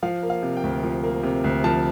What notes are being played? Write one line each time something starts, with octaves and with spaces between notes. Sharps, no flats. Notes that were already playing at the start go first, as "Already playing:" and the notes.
F3 F5
A#3
F5
C3
G5
D2
F3
A#3
C3
D2
F3 A5